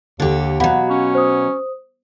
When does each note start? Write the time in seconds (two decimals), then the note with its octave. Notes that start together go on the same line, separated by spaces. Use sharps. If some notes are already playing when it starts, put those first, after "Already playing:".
0.20 D#2 D3 G4
0.60 B2 F#3 F5 F#5 B5
0.90 C#4
1.15 C5 D#6